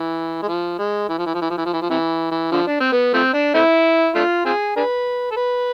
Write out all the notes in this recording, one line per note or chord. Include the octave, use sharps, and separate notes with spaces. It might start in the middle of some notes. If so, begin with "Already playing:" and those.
Already playing: E3
G#3
F3
G#3
E3
F3
E3
F3
E3
F3
E3
F3
E3
F3
C3 E3
E3
D3 F3
D4
C4
B3
F3 A3 C4
D4
A3 C4 E4
A3 D4 F4
C4 F4 G#4
D4 G#4 B4
A4
B4